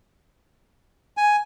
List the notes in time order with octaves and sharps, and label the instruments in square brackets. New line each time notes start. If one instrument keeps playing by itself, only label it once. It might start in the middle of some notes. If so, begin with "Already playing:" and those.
[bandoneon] G#5